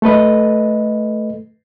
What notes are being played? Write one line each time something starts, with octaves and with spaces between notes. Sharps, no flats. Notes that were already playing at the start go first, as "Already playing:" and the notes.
A3 A4 B4 D#5